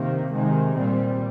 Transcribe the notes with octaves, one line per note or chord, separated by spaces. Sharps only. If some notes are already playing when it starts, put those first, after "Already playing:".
Already playing: C3 D#3 A#3
C3 D#3 G#3
A#2 G3 C4